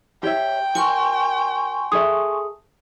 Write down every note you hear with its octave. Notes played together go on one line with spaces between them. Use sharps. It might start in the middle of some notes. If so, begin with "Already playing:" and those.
G4 C#5 E5 G5
F#4 A#4 G#5 C6 C#6
G#4 A4 E5 D#6